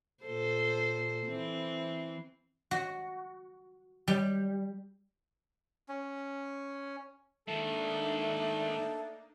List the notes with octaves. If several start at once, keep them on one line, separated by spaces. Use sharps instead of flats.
A#2 A4 C5
E3 C4
F#4
G3
C#4
G#2 D#3 A3 A#3 D4 D#4 A4